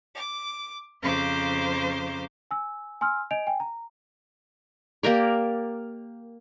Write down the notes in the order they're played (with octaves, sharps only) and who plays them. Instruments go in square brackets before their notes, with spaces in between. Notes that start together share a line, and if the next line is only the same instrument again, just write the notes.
[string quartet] D6
F2 C#3 C5 A#5 C6 D6
[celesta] G#5 E6
G#5 C6 E6 F6
D#5 G#5 G6 D7 F7
G5 G#5
A#5
[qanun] A#3 G4 A#4 D5